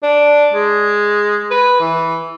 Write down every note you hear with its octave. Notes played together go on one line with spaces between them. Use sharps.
D4
G#3
B4
E3